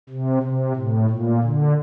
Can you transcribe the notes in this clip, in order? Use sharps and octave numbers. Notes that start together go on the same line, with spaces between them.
C3
C3
A2
A#2
D3